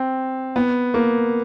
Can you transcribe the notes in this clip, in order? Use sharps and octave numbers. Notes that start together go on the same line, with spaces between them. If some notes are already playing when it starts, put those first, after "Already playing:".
Already playing: C4
B3
A#3